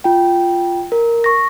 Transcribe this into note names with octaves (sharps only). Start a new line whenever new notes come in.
F4 G5
A#4
C#6 A#6